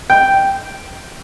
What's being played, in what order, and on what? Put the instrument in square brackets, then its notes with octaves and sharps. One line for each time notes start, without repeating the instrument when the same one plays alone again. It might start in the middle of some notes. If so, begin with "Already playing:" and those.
[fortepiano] G5